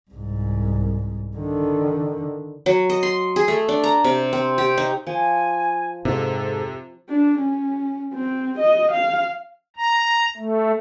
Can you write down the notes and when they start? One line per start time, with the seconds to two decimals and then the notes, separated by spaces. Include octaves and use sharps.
0.11 C2 G#2
1.37 D3 D#3
2.66 F#3
2.90 D#5
3.03 C6
3.36 G#4
3.48 A3
3.69 D4
3.84 A#5
4.04 C3
4.33 C4
4.58 G4
4.78 D#4
5.07 F3 G#5
6.05 F2 G#2 C3 A4
7.09 D4
7.38 C#4
8.14 C4
8.59 D#5
8.92 F5
9.76 A#5
10.37 A3